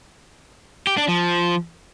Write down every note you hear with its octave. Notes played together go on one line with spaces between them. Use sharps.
G4
D4
F3